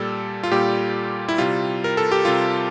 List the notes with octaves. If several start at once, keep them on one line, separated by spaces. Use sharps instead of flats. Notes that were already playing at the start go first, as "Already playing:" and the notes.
Already playing: A#2 G3 A4
F4
A#2 G3 G4
E4
C3 G3 F4
A#4
A4
G4
C3 G3 F4